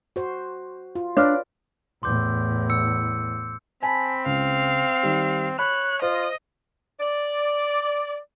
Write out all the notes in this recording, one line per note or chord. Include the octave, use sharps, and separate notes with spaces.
F#4 C5
F4
D4 B4 C#5 D5 F5 F6
E2 A2 C6 D6 G6
E6 C#7
C4 G#5 A5 B5
C#2 F5
D#3 G3
C#5 B5 F#6
F4 C5 D#5
D5